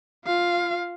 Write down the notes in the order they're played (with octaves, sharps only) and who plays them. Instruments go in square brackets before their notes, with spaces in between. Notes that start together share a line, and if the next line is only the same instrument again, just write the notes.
[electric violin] F4 F5